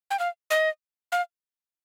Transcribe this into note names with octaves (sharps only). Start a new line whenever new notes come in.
G5
F5
D#5
F5